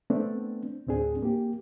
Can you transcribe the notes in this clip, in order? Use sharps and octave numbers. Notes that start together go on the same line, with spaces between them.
A3 B3 C4 D4
D2 A2 C4 D4 G#4
A#3 G4